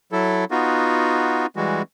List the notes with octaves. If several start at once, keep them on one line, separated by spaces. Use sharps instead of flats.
F#3 E4 A4
B3 D#4 F4 F#4
E3 G3 G#3 F#4